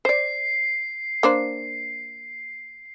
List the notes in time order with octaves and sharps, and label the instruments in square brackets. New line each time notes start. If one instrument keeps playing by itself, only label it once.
[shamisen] C5 D5 [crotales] C7
[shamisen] A#3 D4 C5